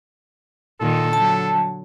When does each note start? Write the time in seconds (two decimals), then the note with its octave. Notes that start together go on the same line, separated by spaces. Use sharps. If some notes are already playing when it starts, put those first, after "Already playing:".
0.80 A#2 D#3 A4
1.13 D3 F#3 A5